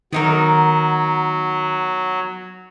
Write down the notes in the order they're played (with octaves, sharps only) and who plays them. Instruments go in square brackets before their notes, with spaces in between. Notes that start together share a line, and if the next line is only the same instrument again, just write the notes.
[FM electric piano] D#3 [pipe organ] F#3 [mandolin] B3 D#4 A#4